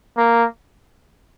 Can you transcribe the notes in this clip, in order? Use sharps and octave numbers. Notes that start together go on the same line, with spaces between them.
A#3